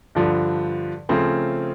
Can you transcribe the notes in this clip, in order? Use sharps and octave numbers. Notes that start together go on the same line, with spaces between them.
G2 D3 F3
C#3 F3 A3 C4